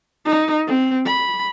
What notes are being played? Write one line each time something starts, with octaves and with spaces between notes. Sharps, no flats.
D#4
C4
B5